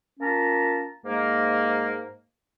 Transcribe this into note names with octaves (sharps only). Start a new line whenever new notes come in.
A#3 C#4 F4 A5 A#5
G#2 G#3 A#3